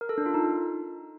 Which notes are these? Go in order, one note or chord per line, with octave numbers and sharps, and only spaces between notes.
A#4
A4
D4
F4
D#4